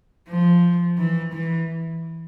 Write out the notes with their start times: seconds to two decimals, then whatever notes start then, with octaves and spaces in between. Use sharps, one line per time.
0.29 F3
0.98 E3
1.33 E3